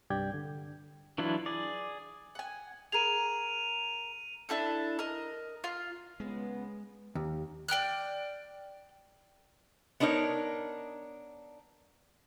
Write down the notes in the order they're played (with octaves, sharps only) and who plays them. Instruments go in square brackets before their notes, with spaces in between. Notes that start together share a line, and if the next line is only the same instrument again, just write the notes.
[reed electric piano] C2 G2 G4 D5 G5 G#6
D3
[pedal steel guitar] E3 F#3 D4 E4 F4
G#4 D5
[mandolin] F#5 G#5
[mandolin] G#4 A#4 [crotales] D#7 F7
[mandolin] D4 E4 G4 A4
A#4 D#5
F4
[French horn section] C#3 B3 [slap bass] G#3
[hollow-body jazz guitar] D#2
[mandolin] D5 G5 F6 F#6
[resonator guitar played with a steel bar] B3 D4 D#4 A#4 C#5